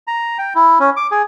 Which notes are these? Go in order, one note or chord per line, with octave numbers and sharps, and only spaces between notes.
A#5
G5
E4
C#4
D6
G#4